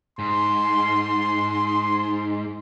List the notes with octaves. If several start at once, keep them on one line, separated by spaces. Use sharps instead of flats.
G#2 C6